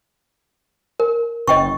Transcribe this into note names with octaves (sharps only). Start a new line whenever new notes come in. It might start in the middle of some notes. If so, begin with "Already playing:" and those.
A#4
F#1 D#5 G5 C#6